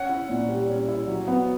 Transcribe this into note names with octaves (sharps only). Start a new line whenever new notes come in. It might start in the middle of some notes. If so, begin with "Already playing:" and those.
Already playing: C#4 F#5
E4
A#2
G3
C#4
E4
F#3
B3